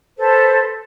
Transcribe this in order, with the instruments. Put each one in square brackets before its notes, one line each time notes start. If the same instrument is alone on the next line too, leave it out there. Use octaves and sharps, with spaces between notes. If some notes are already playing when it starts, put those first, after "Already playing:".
[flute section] A4 B4 C5